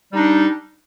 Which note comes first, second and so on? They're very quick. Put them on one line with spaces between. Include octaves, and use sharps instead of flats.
G3 D#4 D4